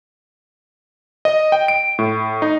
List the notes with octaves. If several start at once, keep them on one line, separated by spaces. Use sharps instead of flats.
D#5
G5
D7
A2
D#4